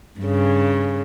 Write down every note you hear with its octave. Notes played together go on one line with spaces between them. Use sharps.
G2 C#3